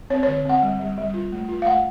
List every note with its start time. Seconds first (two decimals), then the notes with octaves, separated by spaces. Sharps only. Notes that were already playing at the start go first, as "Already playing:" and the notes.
0.10 C4 C#5
0.23 C#5
0.28 D3
0.45 C4 F#5
0.62 G3
0.79 G3
0.98 G3
1.14 F4
1.32 A3
1.49 F4
1.62 F5
1.66 A3 F#5